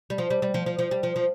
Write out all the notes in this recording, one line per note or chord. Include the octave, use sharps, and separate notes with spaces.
G3
F3
G3
G3
F3
F3
F3
G3
F3
F3